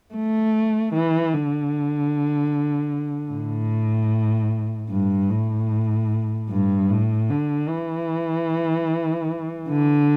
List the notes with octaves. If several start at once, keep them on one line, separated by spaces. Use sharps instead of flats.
A3
E3
D3
A2
G2
A2
G2
A2
D3
E3
D3